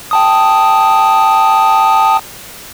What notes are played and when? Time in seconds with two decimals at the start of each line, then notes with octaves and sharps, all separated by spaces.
0.11 G5 A5 D#6